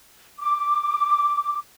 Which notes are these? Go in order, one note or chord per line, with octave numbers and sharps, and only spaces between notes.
D6